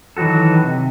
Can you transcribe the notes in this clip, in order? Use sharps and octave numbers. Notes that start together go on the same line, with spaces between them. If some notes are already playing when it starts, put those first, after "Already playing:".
D#3 E3 F#3 F#4 A4
C3